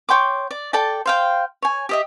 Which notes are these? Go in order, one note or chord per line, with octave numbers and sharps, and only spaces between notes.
C#5 G5 C6 D6
D5
A4 D5 G5 A5
C5 F5 G5
C#5 G#5
G4 D#5 E5